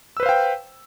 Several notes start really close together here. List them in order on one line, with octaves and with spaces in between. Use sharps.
E6 B4 C5 F5 G5